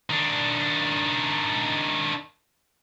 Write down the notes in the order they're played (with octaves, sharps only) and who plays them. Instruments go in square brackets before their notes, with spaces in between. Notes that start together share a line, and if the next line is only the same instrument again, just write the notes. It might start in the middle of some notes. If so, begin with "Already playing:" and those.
[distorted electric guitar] D#3 D4